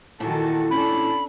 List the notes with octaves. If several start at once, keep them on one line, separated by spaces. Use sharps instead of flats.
A#2 D#3 E3 F#4 A4
C#4 D4 A4 B5